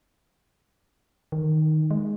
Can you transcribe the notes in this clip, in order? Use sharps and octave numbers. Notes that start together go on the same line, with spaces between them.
D#3
G#3